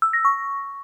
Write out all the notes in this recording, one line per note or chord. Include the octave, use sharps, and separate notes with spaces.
E6
A#6
C#6